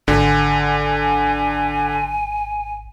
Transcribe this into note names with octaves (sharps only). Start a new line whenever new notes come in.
G#1 D3 G#5